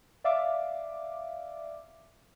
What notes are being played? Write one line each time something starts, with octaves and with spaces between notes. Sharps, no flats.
D5 E5 F5 D6